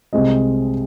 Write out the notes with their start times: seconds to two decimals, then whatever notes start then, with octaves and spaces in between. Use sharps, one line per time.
0.13 C2 C3 G#3 C4 D#5